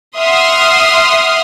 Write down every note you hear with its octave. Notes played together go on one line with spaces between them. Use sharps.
E5 F#5 C6 D#6 F6